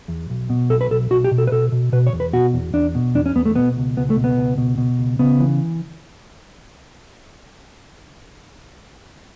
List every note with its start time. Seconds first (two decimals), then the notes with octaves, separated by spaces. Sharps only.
0.08 E2
0.30 B1
0.50 B2
0.70 B1 A4
0.81 B4
0.91 B1 A4
1.10 B1 F#4
1.24 G4
1.31 B2
1.38 A4
1.47 B4
1.52 B2 A4
1.72 B2
1.93 B2 B4
2.07 C#5
2.13 E2
2.20 B4
2.33 B2 F#4
2.53 E2
2.74 E2 D4
2.95 B2
3.15 E2 D4
3.26 C#4
3.35 E2 B3
3.46 A3
3.56 B2 B3
3.77 C#2
3.97 C#2 B3
4.10 A3
4.16 B2
4.24 B3
4.37 C#2
4.58 B2
4.78 B2
4.99 C#2
5.19 C#3 B3
5.40 E3